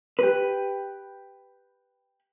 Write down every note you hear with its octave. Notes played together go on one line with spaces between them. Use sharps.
G4 B4